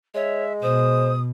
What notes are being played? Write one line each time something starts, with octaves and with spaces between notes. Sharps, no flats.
G#3 C#5 E5
B2 C5 D#6